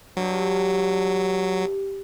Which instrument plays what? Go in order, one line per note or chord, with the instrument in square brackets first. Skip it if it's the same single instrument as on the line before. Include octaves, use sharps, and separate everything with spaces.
[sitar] G2 [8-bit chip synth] F#3